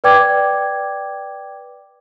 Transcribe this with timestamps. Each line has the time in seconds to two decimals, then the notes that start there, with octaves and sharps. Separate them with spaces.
0.04 B4 D5 G5 D6 G#6